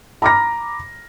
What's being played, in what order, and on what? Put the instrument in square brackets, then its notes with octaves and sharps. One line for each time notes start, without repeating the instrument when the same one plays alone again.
[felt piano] A#5 B5 D6 F6 A#6